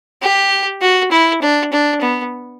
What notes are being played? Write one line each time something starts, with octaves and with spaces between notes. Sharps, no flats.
G4
F#4
E4
D4
D4
B3